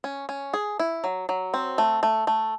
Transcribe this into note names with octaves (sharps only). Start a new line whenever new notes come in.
C#4
C#4
G#4
E4
F#3
F#3
C4
A3
A3
A3